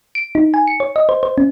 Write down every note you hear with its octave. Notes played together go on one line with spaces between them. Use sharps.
D7
D#4
G#5
C#7
C#5
D#5
C5
C5
C#4